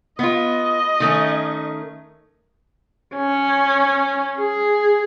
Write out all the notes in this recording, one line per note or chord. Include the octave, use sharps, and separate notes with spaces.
B3 F4 D#5
D#3 A3 C#4
C#4
G#4